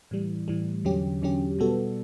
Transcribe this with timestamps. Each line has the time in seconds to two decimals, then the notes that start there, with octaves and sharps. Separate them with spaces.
0.11 A2 E3 G3
0.48 A2 E3 G3
0.85 E2 D3 F#3 C#4 G4
1.22 E2 D3 F#3 C#4 G4
1.59 B2 G3 B3 F#4 A4